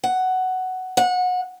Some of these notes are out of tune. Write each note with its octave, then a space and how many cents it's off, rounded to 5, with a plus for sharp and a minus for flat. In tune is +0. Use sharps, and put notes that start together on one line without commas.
F#5 +10
F#5 -25